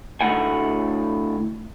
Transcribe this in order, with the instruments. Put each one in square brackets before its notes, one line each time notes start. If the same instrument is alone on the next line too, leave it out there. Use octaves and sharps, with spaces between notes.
[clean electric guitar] D2 A2 F#5 G#5